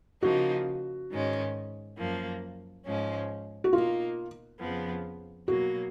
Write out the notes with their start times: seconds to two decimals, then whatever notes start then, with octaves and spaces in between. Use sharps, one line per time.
0.23 C#3 F3 A#3 D#4 F#4
1.11 G#2 D#3 G#3 C#4
1.98 F#2 F3 A#3
2.85 G#2 F3 G#3 C#4
3.64 F#4
3.73 B2 A#3 D#4 F4
4.61 F2 C#3 F3 B3
5.47 B2 F#3 A#3 F#4